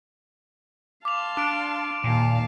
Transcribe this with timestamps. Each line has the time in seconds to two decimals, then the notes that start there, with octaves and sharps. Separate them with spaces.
1.05 F5 A5 C6 D6 F7
1.37 D4 D6 D7
2.04 D#2 A#2 F5 A5